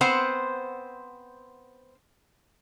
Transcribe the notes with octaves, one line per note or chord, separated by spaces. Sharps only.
B3 C4 C5 F#5